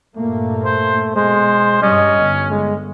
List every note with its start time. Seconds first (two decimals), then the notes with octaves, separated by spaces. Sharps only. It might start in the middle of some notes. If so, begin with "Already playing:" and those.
0.16 G2 A#2 A3 A#3
0.65 C5
1.16 B2 G#3 C5
1.82 G2 G3 C#4 D#5
2.15 G1
2.51 G#3